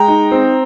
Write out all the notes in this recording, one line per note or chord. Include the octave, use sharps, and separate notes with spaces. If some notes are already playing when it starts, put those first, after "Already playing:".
Already playing: G#3 G5 A#5
D#4
C4